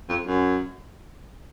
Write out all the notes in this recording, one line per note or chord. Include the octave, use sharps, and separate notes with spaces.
F2
F#2